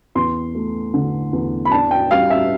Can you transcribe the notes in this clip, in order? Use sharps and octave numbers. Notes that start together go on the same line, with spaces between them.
E2 C6
A3
D3
E2
B5
D4 A5
G5
G3 F5
E5